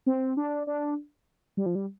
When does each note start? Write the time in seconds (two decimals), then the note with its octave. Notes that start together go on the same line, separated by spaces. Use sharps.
0.06 C4
0.37 D4
0.67 D4
1.57 G3
1.66 F3
1.75 G3